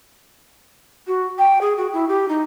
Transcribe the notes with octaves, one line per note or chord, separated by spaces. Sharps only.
F#4
G5
G#4
F#4
E4
G4
D#4